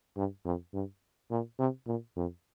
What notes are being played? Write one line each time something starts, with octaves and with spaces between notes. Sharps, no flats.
G2
F2
G2
A#2
C3
A#2
F2